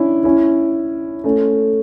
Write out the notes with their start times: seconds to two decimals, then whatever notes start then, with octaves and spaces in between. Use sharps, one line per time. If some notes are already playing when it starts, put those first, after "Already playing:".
Already playing: C#4 D4 E4
0.24 C#4 E4
1.24 A3 C#4